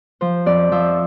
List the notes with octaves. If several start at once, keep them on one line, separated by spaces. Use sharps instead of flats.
F3 C5
F2 D5
F3 E5